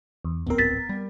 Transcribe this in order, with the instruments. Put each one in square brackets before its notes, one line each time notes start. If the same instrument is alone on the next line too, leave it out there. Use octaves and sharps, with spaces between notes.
[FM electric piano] E2
[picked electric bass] D1 A#1 C4 [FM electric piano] B3 A#4
[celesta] A6 B6
[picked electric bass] G3